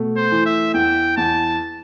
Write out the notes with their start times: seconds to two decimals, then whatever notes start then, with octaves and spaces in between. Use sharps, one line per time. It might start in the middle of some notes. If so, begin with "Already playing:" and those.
Already playing: B2 A3
0.16 C5
0.32 E3
0.46 E5
0.74 E2 G5
1.16 E2 A5